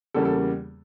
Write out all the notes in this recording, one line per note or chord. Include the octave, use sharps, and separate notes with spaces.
E2 C#3 G3 A#3 A4
A4